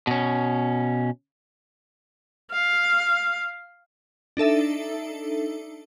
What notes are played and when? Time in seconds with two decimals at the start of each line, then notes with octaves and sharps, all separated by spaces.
0.07 B2 C#4
2.51 F5
4.37 D4 D#4 A4 E5